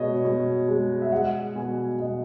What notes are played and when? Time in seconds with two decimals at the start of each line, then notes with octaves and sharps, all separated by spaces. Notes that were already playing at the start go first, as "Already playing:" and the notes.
Already playing: B2 G#3 C#5 D#5
0.25 B2
0.68 G#3
1.02 E5
1.12 G#3 F#5
1.56 B2 G#5
1.99 B2 D#5